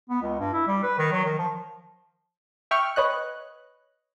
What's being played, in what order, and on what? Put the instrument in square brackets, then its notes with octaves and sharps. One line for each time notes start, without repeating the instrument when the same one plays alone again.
[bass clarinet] B3
C#2
G2
E4
G3
B4
D#3
F#3
D#3
F3
[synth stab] E5 G5 C#6 F6
B4 C#5 D#5 F#6